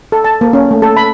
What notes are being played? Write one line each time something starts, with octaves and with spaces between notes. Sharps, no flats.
A4
A5
A#3
C#4
A3
A4
B5